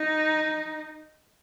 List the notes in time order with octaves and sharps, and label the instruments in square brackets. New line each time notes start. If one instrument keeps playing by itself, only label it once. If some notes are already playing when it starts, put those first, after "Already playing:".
Already playing: [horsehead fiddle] D#4